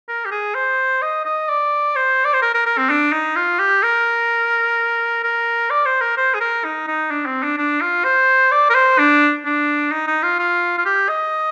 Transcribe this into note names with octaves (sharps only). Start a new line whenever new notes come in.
A#4
G4
G#4
C5
D#5
D#5
D5
C5
D5
C5
A#4
A#4
A#4
C4
D4
D#4
F4
G4
A#4
A#4
D5
C5
A#4
C5
G#4
A#4
D#4
D#4
D4
C4
D4
D4
F4
C5
D5
A#4
C5
D4
D4
D#4
D#4
F4
F4
F4
G4
D#5